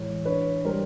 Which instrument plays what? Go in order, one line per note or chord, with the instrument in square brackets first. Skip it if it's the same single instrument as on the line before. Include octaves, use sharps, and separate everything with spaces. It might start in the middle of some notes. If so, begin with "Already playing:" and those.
Already playing: [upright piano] A2 E3 G#3 C#5
D4 B4 C#5
G3 A#4 C5